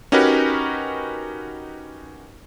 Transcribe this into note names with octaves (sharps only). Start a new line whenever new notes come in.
C#4 D#4 F#4 G4 A#4 B4